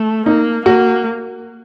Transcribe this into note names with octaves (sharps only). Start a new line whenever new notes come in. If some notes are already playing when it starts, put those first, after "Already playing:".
Already playing: A3
A#3 D#4
A#3 F#4